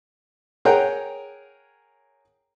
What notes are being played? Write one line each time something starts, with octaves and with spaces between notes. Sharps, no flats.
G#4 A#4 C#5 F#5 G5 A#5